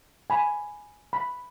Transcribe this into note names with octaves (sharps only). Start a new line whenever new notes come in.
G#5 B5
B5